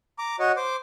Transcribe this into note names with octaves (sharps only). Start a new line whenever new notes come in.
A#5 D6
F#4 C#5 D#5
C5 D6